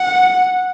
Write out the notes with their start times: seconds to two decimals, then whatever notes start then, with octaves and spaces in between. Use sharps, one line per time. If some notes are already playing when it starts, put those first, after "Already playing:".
Already playing: F#5